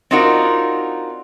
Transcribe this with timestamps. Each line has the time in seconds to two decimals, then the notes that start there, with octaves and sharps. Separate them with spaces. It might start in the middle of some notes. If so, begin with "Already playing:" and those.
0.11 C4 D4 D#4 F4 F#4 A#4